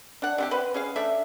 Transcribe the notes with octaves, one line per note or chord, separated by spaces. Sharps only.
D4 F#5
C3 A3 G4
B4 C5 F#5
C#4 G#4 F5
A3 D4 E5